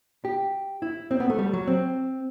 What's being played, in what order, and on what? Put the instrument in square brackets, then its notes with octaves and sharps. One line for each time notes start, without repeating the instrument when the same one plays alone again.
[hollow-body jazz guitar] G4
E4
C4
B3
A3
G3
F#3
C4